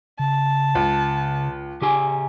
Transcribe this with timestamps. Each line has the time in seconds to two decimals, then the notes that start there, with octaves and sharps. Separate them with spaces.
0.19 C#3 A5
0.75 C#2
1.81 C#3 G4 G#5